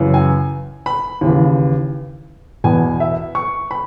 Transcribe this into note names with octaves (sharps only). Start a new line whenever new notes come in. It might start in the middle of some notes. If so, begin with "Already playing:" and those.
Already playing: F#2 C#3 E3
G#5
B5
D#2 C#3 E3
E2 B2 G#5
E5
C#6
B5